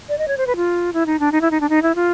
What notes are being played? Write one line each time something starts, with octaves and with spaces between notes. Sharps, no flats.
D5
D#5
C#5
C5
B4
F4
E4
D#4
D4
D#4
E4
D#4
D4
D#4
E4
F4